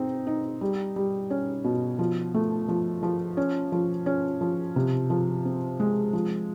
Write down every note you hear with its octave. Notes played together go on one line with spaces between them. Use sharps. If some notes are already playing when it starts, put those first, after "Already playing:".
Already playing: C4 D#4
D#4
G3
G3
C#4
B2
F3
A3
F3
F3
C#4
F3
C#4
F3
C3
F3
C4
G#3
F3